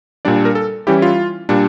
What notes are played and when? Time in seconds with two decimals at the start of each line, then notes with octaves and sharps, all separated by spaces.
0.25 A#2 G3 D4 D5
0.45 A#4
0.55 A4
0.87 E3 G3 C#4 E4 G4
1.02 F4
1.49 A#2 G3 D4